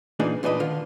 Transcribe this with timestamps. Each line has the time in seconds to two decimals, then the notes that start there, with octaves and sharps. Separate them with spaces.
0.19 A#2 E3 A#3 D4 D#4 G#4
0.43 E2 A#2 D4 B4 D#5
0.60 D3 D#3 F4